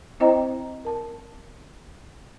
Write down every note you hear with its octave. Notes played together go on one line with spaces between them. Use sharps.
C4 E4 C5 D#5 G5 A#5
A#4 A5